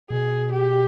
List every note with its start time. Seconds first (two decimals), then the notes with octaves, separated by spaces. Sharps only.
0.10 B2 G#4
0.53 G4